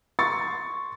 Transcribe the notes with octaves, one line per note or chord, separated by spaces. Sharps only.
C6 C#6 A6